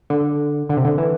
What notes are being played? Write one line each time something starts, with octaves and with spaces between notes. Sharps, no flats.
D3
D3
C3
D3
E3